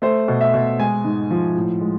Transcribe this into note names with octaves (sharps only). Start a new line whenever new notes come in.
A3 C5
B2
E5
B2
G#3 G#5
G#2
F3
A2
G#3